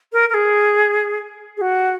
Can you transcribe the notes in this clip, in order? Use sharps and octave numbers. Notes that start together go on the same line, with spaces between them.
A#4
A#4
G#4
G#4
F#4